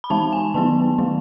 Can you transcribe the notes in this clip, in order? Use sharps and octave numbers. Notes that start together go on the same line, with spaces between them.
B5
E3 G#3 D#4 A5
G#5
D#3 F#3 B3 E4 A5
D#3 F#3 A3 E4